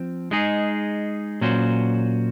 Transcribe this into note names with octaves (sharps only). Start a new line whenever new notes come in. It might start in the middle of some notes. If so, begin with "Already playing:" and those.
Already playing: F3 C4
G#3 D#4 G#4
A#2 F#3 C#4 F#4 C5